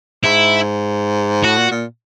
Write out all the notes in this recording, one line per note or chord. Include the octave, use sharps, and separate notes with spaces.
G#2 E4
A2 F#4
A#2
A#2